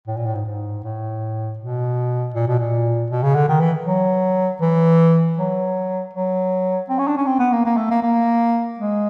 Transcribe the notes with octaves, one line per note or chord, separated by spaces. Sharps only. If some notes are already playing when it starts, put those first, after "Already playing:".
A2
A#2
A2
G#2
G#2
A2
B2
A#2
B2
A#2
B2
C#3
D3
D#3
E3
F#3
E3
F#3
F#3
C4
C#4
D4
C#4
C4
B3
A#3
A#3
A3
A#3
A#3
G#3